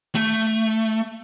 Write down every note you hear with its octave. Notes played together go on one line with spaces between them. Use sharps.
A3